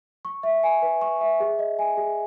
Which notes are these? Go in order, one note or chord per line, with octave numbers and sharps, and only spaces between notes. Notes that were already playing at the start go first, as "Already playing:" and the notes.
C#6
E5
G#5
B4
C#6
E5
G#4
D#5
G#5
G#4